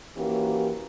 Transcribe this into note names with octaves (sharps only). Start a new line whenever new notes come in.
D#3 E3 A#3 C#4 F#4 G4